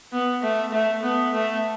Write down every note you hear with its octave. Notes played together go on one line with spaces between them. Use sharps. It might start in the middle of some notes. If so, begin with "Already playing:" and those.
B3
A3
A3
B3
A3